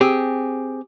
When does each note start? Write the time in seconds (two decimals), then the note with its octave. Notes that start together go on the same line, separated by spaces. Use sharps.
0.01 C4 G4 G#4